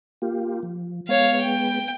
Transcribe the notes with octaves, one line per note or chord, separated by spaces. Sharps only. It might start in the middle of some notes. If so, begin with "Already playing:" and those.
A#3 F4 G4
F3
G#3 B3 C#5 F5
G5